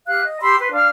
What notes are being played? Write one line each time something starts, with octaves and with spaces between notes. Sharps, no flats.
G4 F5 F#6
D#5
G4 B5 C6 E6
B4 C6
D4 F5 F6